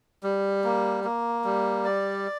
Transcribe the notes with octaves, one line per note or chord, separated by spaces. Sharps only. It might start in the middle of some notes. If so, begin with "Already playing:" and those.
G3
A#3
A#3
G3
D5